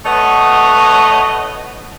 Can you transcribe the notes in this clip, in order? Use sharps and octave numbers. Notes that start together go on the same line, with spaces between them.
A3 B4 C#5 D#5 F#5